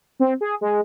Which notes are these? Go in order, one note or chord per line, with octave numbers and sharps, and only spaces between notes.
C4
G#4
G#3